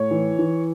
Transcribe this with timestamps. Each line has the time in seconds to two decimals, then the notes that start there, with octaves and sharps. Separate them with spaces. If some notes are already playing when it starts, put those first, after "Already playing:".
Already playing: A2 C#5
0.11 E3
0.39 E3